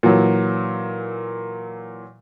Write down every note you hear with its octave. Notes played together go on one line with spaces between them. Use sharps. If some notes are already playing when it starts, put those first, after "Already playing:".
A#2 E3 F#3